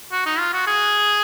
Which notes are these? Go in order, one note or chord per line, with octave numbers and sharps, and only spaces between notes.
F#4
D#4
F4
F#4
G#4